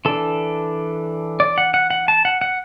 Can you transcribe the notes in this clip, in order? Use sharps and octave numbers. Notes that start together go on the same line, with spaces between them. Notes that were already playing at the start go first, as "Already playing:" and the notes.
E3 D4 A4
D5
F#5
F#5
F#5
A5
F#5
F#5